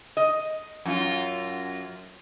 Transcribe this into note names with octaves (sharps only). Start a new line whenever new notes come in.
D#5
F#2 F4